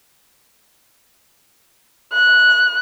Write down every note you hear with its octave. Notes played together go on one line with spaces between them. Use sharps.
F#6